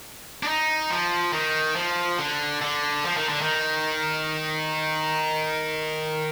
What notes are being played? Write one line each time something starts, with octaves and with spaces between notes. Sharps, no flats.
D4
D#4
F3
D#3
F3
D3
D3
F3
D#3
D3
D#3